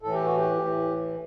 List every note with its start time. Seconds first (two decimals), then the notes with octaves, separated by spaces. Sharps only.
0.02 A2 E3 A4
0.14 G4
0.25 F#4
0.37 G4
0.59 A2 E3